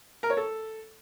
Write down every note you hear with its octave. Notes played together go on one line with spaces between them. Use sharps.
A#4
C#5
A4